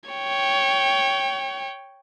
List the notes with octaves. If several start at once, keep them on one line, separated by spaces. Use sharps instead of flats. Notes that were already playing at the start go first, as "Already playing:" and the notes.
C#5 G5